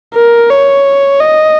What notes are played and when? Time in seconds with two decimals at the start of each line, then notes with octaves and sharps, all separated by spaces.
0.14 A#4
0.50 C#5
1.20 D#5